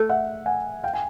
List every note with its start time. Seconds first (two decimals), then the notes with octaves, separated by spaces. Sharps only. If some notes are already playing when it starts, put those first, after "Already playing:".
Already playing: A3
0.09 E5 F#5
0.46 F#5 G#5
0.84 F5 G5
0.94 G#5